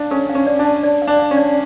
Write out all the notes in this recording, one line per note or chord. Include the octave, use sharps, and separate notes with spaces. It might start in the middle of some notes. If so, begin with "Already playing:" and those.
Already playing: D4 F5
C#4 A4
F5
C#4
D5
D4
A5
D5
F5
D4
F5
C#4
D5